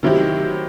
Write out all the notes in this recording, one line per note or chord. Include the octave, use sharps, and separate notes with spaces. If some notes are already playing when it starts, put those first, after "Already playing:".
D#3 F#3 C4 E4 G4